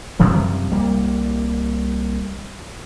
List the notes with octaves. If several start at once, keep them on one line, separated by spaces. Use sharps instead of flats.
F#2 C3 F3 G3
C2 G3 A#3